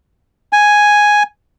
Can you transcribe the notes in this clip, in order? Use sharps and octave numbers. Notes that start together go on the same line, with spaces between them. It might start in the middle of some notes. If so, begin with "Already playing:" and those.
G#5